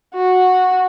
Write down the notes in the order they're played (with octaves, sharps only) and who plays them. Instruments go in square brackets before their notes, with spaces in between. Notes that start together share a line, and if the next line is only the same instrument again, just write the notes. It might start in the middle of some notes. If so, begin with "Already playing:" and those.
[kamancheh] F#4